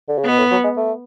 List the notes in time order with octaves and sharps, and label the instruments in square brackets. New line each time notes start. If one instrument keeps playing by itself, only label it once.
[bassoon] D3
C#3
[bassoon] B2 [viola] B3
[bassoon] A2
F#3
G#3
A3